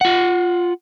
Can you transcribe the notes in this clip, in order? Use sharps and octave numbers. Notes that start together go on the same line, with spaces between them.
F4 F#5